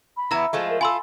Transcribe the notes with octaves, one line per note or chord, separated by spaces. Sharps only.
B5
E2 B3 E4 E5 A#5
F3 G#3 A3
A#4
F4 A4 G#5 B5 C6 E6